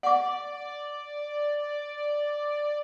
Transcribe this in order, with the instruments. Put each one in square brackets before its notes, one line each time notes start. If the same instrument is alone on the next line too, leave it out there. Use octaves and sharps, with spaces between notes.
[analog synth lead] D5 [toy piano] F#5 D6